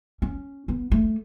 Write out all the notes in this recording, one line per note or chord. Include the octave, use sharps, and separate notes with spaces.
C#4
B3
A3